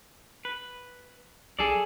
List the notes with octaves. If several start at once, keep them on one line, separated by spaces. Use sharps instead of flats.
B4
B1 G#4 A4 D5